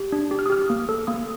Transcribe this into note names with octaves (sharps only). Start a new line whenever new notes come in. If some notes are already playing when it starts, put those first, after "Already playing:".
Already playing: G4
D4
G4
F6
D#6
G4 F6
A#3
A4
A#3 D#6